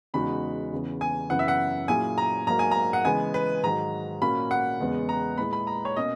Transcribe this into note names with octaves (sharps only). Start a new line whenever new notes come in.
E2 C#3 G#3 D#4 F#4 B5
E2 C#3 E3
G#5
F#2 C#3 E3 B3 E4 F#5
E5
F#5
A#2 F#3 C#4 E4 G#4 G#5
A#5
G#2 F#3 A#3 A#5
G#5
A#5
F#5
C#3 E3 G#3 B3 G#5
B4
G#2 D#3 F#3 A#5
A#2 A#3 C#4 F#4 B5
F#5
E2 C#3 G#3 B3
A#5
A#2 G#3 B3 E4 B5
B5
A#5
C#5
B2 A#3 C#4 D#5